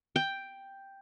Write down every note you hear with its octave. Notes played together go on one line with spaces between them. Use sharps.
G5